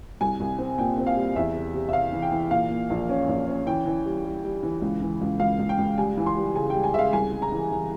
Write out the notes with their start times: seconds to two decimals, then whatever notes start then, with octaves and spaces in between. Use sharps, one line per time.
0.21 C2 G#5
0.40 C2
0.58 C4
0.78 A#2 G5
0.98 C4
1.07 F5
1.16 G3
1.36 E2 E5
1.55 C3
1.74 C3
1.89 E5
1.93 C3 F5
2.13 E3
2.22 G5
2.32 E3
2.51 A#2 F5
2.71 A#2
2.90 A#1
3.09 C#4
3.29 A#1
3.47 C#4
3.67 E3 G5
3.86 E3
4.05 G3
4.24 G3
4.44 G3
4.63 E3
4.82 C#2
5.02 E3
5.21 C#2
5.40 C#2 F5
5.59 C#2
5.69 G5
5.78 C#2
5.97 G3 G#5
6.17 E3
6.26 C6
6.36 G3
6.55 C#3 G#5
6.70 G3 G5
6.84 G#5
6.94 C#3 E5 F5
7.13 C2 G#5
7.32 G#3
7.42 A#5
7.52 E3
7.71 E3